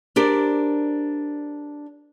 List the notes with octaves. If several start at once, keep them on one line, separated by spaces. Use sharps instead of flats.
D4 G4 A#4 C5 D5